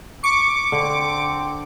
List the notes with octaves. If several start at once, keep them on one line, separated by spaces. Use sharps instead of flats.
C#6 D6 C#7
D3 C4